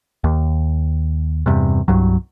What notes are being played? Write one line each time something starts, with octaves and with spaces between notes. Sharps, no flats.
D#2
E2 G2 C3
C2 G2 F#3